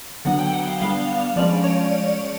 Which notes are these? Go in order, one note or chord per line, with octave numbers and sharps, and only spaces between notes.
D3 F#3 B3 D4 F#5
G5
F#5
F5
G3 B3 D4 F5
F3 G#3 C#4 D5
C#5